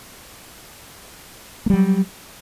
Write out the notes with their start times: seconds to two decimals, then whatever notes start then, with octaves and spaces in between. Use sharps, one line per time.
1.66 A#3
1.70 G3
1.73 F#3